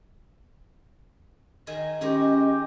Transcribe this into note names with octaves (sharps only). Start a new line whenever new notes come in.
D#3 G#4 D#5 G#5
D#3 G#3 C#4 G4 G#4